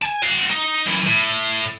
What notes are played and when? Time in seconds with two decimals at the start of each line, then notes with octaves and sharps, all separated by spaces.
0.02 G#5 A5
0.23 F#4 F5
0.51 D#4
0.86 F#2 E3
1.06 A2